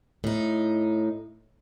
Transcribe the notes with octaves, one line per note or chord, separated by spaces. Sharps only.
A2 D#4